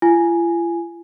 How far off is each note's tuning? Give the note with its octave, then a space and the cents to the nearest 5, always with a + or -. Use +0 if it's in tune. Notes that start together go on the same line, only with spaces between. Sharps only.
F4 -45 G#5 +0